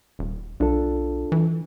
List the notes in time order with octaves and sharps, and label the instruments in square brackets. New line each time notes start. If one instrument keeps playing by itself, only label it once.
[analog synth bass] D#1
[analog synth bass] B1 [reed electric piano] D4 F4 A4
[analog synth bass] E3